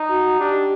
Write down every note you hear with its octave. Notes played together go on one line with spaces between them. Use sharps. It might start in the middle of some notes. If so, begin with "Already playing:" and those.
Already playing: D#4
F#4
D4 G4